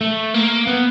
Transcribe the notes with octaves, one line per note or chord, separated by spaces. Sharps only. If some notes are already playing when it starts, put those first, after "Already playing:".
A3
A#3
B3